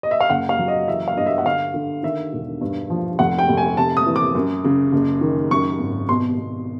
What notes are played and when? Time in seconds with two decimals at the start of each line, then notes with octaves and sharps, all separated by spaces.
0.03 D#5
0.11 E5
0.21 F5
0.30 F#1 F#5
0.49 F5
0.59 F#3
0.68 D#5
0.88 E3 E5
1.08 F5
1.17 G2 D#5
1.26 E5
1.38 F#5
1.45 D3 F5
1.74 D3
2.03 D#3 E5
2.33 E1
2.61 G2
2.90 F3
3.19 F1 F#5
3.39 G5
3.49 F1
3.57 G#5
3.77 C3 A5
3.97 D#6
4.06 E3
4.16 D6
4.35 F#2
4.64 C#3
4.92 F#1
5.21 D#3
5.51 F#2 C#6
5.79 G#1
6.09 B2 C6
6.37 B2